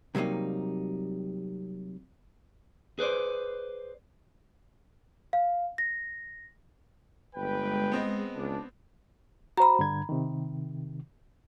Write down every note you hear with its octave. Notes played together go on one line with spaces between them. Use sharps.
C3 F#3 G3 A#3 D#4
G#4 B4 C5 D5
F5
A#6
G1 G#3 B4 G5
B3 C4 D#5
C#2 D4
F#4 C5 A#5 B5
G2 D3 G#6
C3 D#3